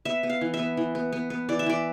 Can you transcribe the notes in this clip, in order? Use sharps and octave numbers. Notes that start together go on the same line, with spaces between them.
B3 E5
B3
F5
E3
E5
B3
E3
B3
B3
B3
E3 D5
E5
E3 D5